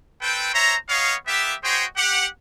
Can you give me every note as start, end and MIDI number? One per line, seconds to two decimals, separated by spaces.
0.22 0.51 60
0.22 0.51 69
0.22 0.51 71
0.22 0.51 79
0.54 0.76 72
0.54 0.76 73
0.54 0.76 76
0.54 0.76 82
0.89 1.15 59
0.89 1.15 73
0.89 1.15 75
0.89 1.15 77
1.27 1.54 58
1.27 1.54 59
1.27 1.54 67
1.27 1.54 76
1.63 1.84 66
1.63 1.84 68
1.63 1.84 72
1.63 1.84 73
1.63 1.84 75
1.63 1.84 79
1.97 2.26 67
1.97 2.26 78